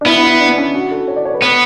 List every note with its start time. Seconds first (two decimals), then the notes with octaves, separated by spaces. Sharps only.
0.01 D4
0.06 B3 E4
0.23 E4
0.40 D4
0.57 C#4
0.75 F#4
0.91 A4
1.08 C#5
1.16 D5
1.25 C#5
1.34 B4
1.42 B3 C#5